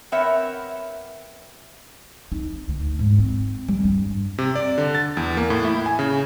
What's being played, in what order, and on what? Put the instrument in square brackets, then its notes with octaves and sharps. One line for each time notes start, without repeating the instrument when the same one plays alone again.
[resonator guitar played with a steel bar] B3 C4 A#4 C#5 E5 F#5
[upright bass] D#4
D2
G#2
C4
G3
G2
[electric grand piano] C3
D5
D3
A6
E2
A#3
A2
E4
G#5
C#3